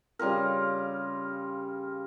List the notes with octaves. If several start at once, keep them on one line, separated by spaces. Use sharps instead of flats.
C#3 G3 F4 A#4